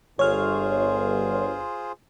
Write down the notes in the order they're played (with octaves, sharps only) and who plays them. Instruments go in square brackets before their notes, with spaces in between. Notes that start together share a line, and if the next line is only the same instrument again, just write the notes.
[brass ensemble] G1 [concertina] F4 G#4 C5 [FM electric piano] C#5 F6